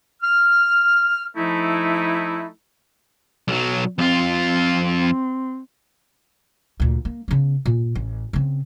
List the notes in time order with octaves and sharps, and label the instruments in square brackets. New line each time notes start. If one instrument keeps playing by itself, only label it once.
[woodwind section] F6
F3 A3 D#4 E4
[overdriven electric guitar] B1 F#3
[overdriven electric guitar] F2 F4 [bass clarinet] C4
[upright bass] D2 A#2
A#3
C#3 B3
A#2
A1
C#3 C4